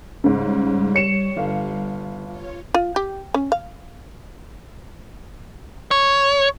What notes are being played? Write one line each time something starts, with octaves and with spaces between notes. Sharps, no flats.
G#2 C#3 G3
C#5 C#7 E7
G1 F5
F4 C#5
F4
G4
C#4
F5
C#5